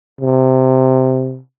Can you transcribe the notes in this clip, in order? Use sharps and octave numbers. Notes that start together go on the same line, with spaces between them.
C3